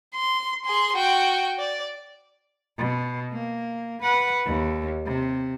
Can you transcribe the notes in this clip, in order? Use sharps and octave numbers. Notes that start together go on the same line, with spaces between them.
C6
G#4 C6
F#4 G5
D5
B2
A#3
B4 F#5
D#2
C3